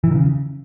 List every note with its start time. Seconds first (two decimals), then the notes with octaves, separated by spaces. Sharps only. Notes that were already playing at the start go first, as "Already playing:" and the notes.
0.04 E3
0.11 D#3
0.15 C#3